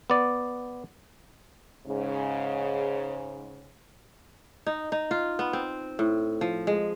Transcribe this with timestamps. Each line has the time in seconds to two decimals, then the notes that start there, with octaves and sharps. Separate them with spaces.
0.10 B3 D5
1.87 G#2 C#3
4.66 D#4
4.92 D#4
5.11 F4
5.39 B3
5.53 C4
5.99 A2
6.41 F3
6.67 G#3